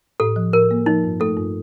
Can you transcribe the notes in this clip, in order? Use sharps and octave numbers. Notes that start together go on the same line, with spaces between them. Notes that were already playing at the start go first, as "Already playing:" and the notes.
A2 A4
F3
A2 A#4
A#3
F3 D#4
G2
A3 A4
G2